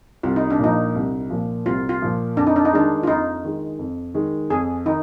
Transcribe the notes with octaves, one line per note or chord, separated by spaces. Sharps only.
C2 F4
D#4
D4
A#2 F3 D#4
C2
A#2 F3
C2 F4
F4
A#2 F3
F2 D4
D#4
D4
D#4
D#3 G#3 D4
F4
F2 D#4
D#3 G#3
F2
D#3 G#3
F2 G#4
D#3 D#4